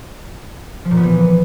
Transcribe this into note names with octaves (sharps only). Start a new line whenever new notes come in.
F3
A#2
B3
E3